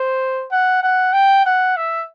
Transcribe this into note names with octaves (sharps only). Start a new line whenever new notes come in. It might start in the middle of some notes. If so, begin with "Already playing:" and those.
Already playing: C5
F#5
F#5
G5
F#5
E5